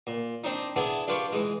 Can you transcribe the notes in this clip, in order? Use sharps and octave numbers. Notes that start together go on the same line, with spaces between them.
A#2
C4 D4 D#4
B3 D4 E4 G#4 A5
D4 F4 G4 B4 G5 C#6
E3 G#3